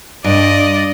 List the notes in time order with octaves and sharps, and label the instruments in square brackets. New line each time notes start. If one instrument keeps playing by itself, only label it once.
[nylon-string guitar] G2 [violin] D5 D#5